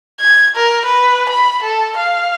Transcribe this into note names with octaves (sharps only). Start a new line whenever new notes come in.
G#6
A#4
B4
B5
A4
F5